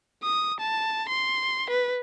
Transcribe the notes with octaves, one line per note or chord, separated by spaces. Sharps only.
D#6
A5
C6
B4